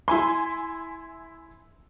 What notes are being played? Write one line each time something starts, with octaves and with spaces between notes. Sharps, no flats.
E4 G#5 C6